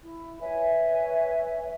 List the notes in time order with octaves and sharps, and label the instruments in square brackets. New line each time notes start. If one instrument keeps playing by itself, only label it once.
[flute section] E4
B4 C#5 E5 G#5